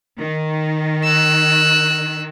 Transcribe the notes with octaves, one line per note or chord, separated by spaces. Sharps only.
D#3
E6 F#6